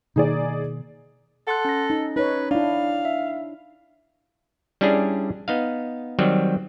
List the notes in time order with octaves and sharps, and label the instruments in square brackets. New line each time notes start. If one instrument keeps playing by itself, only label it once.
[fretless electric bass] B2 D#3 A#3 [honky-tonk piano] D#4 G#4 D5
[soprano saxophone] A4 [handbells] F#5 C6 F#6
[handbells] C#4 A#6
[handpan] D#4
[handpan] D#4 C#5 [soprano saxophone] B4
[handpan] D4 E4 [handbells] D5 [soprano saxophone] F5
[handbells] E5
[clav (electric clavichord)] G3 C#4 D4 E4 G#4
B3 D#4 F5
D#3 F#3 G3 C4